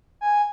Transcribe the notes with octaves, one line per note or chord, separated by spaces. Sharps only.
G#5